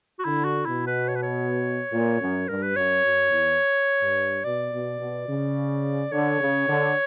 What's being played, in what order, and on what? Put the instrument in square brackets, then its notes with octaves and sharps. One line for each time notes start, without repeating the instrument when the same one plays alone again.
[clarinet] F#4
[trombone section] D3 [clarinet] E4
[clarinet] F#4
[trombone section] B2 [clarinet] E4
[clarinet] B4
C#5
B4
C#5
[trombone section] A#2
F#2
[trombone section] G2 [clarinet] A#4
[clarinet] B4
[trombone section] F#2 [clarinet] C#5
[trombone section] F#2
E2
G2
[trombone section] B2 [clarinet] D5
[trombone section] B2
B2
C#3
[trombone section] D3 [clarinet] C#5
[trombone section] C#3
D3